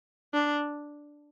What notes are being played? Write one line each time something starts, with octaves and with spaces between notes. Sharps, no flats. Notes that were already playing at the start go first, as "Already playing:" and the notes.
D4